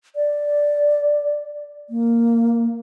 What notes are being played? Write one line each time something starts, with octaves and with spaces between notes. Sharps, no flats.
D5
A#3